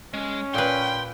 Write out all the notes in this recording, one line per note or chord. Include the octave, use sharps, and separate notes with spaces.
G#3 C#4
A#2 B4 G5 C6